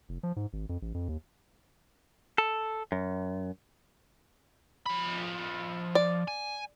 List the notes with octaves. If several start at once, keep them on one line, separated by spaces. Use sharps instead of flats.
F1
F3
G#2
G#1
F2
A1
F2
D#2
A4
F#2
F3 B5
D5
G#5